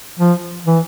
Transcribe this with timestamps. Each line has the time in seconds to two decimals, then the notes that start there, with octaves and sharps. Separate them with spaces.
0.19 F3
0.65 E3